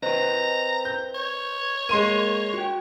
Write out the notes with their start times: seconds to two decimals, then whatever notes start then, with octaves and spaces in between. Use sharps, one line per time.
0.02 C4 A#4 B4 D#5 A#5
0.85 G6
1.14 C#5
1.89 G#3 A#3 C6 D#7
2.54 F#4 G5